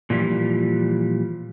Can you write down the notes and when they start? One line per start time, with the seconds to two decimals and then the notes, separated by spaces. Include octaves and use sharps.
0.10 A#2 E3 F3 G3